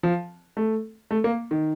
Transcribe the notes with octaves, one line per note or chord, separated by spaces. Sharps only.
F3
A3
A3
A#3
D#3